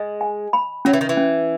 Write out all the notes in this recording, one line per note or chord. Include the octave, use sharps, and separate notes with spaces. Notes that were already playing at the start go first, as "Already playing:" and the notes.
Already playing: G#3 D#5
G#5
B5
F#3 C#4
E3
D#3
E3
C#4